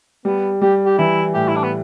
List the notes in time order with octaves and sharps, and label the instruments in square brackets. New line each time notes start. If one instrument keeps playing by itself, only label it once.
[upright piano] G3 [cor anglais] B3
[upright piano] G3 [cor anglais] G4
[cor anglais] G4
[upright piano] E3 [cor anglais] E4
[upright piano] A2 [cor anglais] G4
[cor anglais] E4
D4
B3